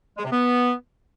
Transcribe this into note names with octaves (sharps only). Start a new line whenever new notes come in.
G#3
C3
B3